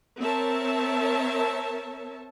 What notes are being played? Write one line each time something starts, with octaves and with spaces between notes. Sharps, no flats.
C4 A#4 C#5 E5 A5